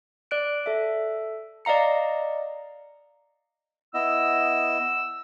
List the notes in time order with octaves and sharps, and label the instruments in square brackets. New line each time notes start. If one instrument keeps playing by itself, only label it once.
[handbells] D5 F#6 D7
A4 E5
D5 D#5 F5 A#5 C#7
[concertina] B3 E4 D#5 [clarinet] E6